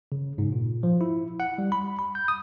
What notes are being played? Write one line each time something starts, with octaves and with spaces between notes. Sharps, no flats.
C#3
G#2
A#2
F3
E4
F#5
G3
B5
B5
G6
D#6